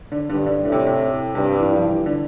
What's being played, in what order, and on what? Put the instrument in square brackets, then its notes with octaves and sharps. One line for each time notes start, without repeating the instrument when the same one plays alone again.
[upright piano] D3
[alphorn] G2 [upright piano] D3
[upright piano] D3
[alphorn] A2 [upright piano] D3
[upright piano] C3
C3
[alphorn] G2 [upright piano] C3
[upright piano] E3
F3
E3
D3